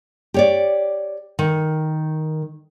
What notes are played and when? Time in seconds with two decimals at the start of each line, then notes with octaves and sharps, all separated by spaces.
0.34 G4 C#5 D5
1.39 D#3